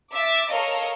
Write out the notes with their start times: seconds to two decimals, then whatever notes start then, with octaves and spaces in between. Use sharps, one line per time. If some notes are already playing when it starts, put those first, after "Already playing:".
0.12 E5 D6 A6
0.50 A4 A#4 C#5 D#5 F5